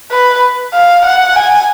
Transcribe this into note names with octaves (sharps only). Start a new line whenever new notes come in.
B4
F5
F#5
G#5